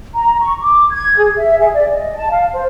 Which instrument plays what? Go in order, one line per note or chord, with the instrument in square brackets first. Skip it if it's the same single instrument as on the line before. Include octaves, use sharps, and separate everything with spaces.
[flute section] A#5
C#6
D6
G#6
G#4
E5
G#4
D5
D#5
A5
F5
C5